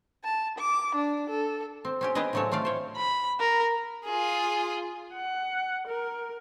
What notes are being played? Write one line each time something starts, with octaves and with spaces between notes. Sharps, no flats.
A5
D6
D4
A4
C4
C4 C#4 G4
G#3 B3 G4 G#4 B4 D#5
A2 C#3 F#3 C4 A4 C#5
A3 F4 D5 F5
C5 C#5
B5
A#4
F4 G#4
F#5
A#4